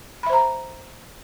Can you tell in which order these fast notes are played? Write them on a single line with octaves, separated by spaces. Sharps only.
B5 E5 C5 A#5